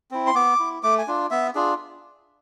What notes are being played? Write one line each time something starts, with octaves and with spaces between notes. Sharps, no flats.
C4 E4
C6
B3 D6
E4
A3 D6
G#5
D4 F4
B3 E5
D4 F4 G#4